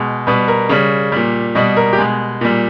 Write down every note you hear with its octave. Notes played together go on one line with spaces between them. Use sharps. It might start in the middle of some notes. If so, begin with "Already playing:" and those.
Already playing: B2 G#3
B2 G3 B4
A#4
C#3 G3 C#5
A#2 G3
B2 G3 D#5
A#4
G4
B2 G#3 G#4
A#2 G3